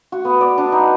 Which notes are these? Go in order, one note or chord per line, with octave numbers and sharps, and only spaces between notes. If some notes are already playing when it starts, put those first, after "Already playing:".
F#4
B3
D5
D4
D#4